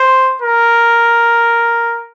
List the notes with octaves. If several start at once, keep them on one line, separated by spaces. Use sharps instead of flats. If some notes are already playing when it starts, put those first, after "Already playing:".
Already playing: C5
A#4